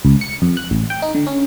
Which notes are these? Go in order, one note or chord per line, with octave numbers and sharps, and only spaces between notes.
C#2
C#7
F2
F#6
A1
G5
D#4
D3
C#4